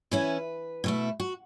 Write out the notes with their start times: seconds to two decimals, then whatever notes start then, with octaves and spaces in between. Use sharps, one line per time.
0.11 E3 C#4 E4 B4
0.84 B2 A3 E4
1.20 F#4